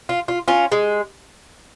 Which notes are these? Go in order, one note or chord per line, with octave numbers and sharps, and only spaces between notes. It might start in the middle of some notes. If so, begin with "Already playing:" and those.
F4
F4
C#4 F4
G#3